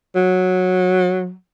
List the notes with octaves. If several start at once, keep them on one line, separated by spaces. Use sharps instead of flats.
F#3